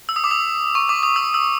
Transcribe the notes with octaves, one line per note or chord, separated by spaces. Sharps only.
E6
D#6
D6
D#6
C#6
D6
D#6
E6
E6